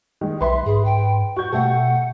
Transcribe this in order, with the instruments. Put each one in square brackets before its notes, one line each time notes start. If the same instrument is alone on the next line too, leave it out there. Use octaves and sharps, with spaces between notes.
[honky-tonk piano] D#3 G#3
[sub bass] B1 [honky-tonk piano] B4 C6 [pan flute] E5
[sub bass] G#2 [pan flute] G#4
[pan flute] G5
[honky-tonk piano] F#4 G6 [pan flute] C#6
[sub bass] B2 [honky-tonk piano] A3 G4 A4 [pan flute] F#5